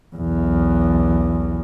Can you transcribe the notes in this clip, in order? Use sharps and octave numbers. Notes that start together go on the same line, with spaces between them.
B1 E2